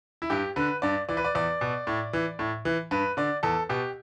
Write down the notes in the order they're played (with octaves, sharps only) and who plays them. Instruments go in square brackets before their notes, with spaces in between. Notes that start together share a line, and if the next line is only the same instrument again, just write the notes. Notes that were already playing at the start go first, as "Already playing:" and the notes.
[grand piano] E4
G2 G4
D3 B4
G2 D5
E3 D5
B4
D5
E2 D5
B2
A2
E3
A2
E3
G2 B4
D3 D5
E2 A4
B2 G4